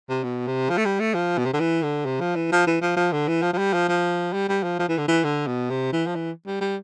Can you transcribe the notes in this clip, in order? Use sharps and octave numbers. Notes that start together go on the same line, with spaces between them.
C3
B2
C3
F3
A3
G3
A3
F3
B2
C3
D3
E3
D3
C3
F3
E3
F3
E3
F3
F3
D3
E3
F3
F3
G3
F3
F3
G3
G3
F3
F3
E3
D3
E3
D3
B2
C3
E3
F3
E3
G3
G3